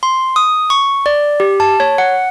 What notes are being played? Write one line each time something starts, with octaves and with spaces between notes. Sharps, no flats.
C6
D#6
C#6
D5
G4
A5
C#5
F#5